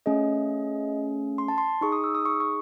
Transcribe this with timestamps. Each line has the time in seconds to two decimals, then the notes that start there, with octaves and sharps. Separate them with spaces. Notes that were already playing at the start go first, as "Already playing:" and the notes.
0.06 A3 C#4 G#4 D#5
1.38 C6
1.48 A5
1.58 C6
1.81 D#4 G#4 C#6
1.92 D#6
2.04 E6
2.15 D#6
2.25 C#6
2.40 C#6